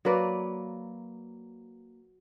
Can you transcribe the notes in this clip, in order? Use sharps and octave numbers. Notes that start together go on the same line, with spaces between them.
F#3 A#3 B4 D5